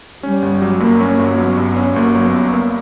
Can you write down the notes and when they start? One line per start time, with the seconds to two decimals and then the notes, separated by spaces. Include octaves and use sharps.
0.23 G3 C#4
0.42 G1
0.62 F#3
0.80 G2 A#3
1.01 C#4
1.10 A#3
1.19 G1
1.38 F#3 B3
1.57 G2
1.77 C#4
1.96 G1 A#3
2.15 F#3
2.25 B3
2.34 G2
2.53 A#3